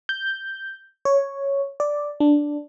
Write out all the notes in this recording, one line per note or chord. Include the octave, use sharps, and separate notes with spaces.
G6
C#5
D5
D4